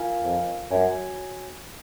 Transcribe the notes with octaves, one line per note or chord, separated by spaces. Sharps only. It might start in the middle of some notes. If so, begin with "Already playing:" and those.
Already playing: F4 A#4 F5 G#5
F2
F#2 F#4 C#5 G#5